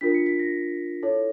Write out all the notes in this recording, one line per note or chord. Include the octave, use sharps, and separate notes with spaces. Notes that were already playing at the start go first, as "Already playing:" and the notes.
D4 F4 A#4 B6
C#7
B6
A#6
E4 A4 C#5